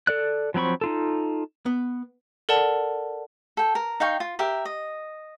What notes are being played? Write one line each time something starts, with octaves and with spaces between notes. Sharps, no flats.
A4 D5 F#6
F3 F#3 C4 B5 C#6
D#4 F4 A4
B3
A4 A#4 D5 F#5 A5
A4 G5
A#4
D#4 F5 G5 C#6
F4
G4 A#4 E5
D#5